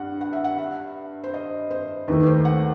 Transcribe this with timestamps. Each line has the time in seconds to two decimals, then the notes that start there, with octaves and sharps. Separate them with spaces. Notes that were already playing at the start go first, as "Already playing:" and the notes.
Already playing: G2 F#5
0.21 F#5
0.33 E5
0.44 F#5
0.58 E5
1.24 C5
1.34 D#5
1.71 C5
2.08 D#2 D#3 A3 B4
2.27 C5
2.45 F#5